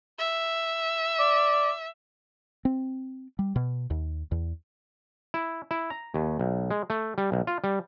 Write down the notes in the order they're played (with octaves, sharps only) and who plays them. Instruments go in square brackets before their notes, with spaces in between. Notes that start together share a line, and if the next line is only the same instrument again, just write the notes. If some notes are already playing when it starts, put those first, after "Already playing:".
[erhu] E5
[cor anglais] D5
[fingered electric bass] C4
G3
B2
D#2
E2
[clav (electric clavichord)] E4
E4
A#5
D#2
B1
G#3
A3
G3
B1
F4
G3